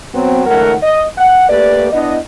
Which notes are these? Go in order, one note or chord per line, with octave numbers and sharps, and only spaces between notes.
F#3 B3 C4
C#2 D#3 A3 A#4 F#5
D#5
F#5
A3 A#3 G4 B4 D5
B3 D4 E4 D#5